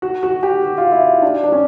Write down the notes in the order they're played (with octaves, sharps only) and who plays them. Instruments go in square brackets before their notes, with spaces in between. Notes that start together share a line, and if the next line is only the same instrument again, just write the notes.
[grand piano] F#4
F#4
G4
F#4
F4
E4
D4
D4
C#4